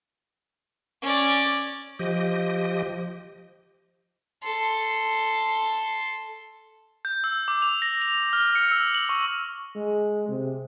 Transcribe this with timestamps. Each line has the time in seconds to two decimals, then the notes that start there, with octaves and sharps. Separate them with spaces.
1.02 C#4 D5
1.99 F3 G4 D#5
4.43 A4 C6
7.05 G6
7.24 E6
7.48 D6
7.62 F7
7.82 A#6
8.02 F7
8.33 F6
8.55 C#7
8.72 E6
8.95 F#7
9.09 C#6
9.76 G#3
10.29 C3